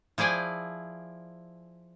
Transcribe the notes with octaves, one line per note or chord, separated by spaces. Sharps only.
F3 E4 G#4 D5 G5 G#5